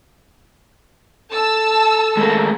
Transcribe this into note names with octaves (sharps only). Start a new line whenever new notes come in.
A4 A5 E6
G#3 A3 A#4